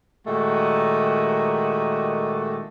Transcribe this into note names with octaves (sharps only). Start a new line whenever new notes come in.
A#2 D#3 G#3 A3 F#4 G4